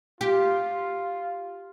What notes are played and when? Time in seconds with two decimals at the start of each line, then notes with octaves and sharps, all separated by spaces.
0.21 F4 G4